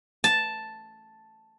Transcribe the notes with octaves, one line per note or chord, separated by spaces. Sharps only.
A5